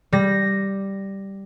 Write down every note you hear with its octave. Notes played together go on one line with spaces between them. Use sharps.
G3 A#6